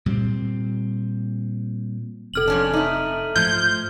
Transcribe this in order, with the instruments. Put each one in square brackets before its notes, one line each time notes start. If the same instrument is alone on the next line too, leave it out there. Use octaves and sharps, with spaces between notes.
[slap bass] A#2 G3 A#3 C4
[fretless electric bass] F1 C3 [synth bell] A4 F6 F#7
[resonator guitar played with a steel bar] F2 C#4 D4
A3 D#4
[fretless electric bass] G#2 A3 [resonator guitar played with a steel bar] F3 [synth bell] F6 G#6 [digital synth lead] G6